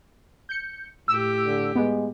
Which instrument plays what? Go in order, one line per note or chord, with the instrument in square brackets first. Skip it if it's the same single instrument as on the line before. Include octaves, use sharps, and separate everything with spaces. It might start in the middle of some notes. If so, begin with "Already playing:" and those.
[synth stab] G6 C#7
[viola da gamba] A2 G4 [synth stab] E6
[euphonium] D3
[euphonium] G#3 [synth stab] B3